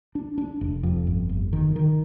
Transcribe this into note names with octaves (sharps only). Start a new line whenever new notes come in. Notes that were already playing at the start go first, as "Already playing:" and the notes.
D4
D4
F1
F2
G1
G1
D#3
D#3